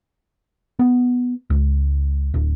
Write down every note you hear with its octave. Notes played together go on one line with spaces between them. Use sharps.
B3
C#2
D1